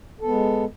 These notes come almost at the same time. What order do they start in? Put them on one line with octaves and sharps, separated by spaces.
A4 B3 G#3